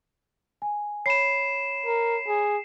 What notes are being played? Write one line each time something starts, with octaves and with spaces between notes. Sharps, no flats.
G#5
C#5 B5 C7 E7
A#4
G#4